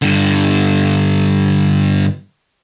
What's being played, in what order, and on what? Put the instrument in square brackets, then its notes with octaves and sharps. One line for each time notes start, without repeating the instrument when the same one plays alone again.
[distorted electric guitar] G2 D3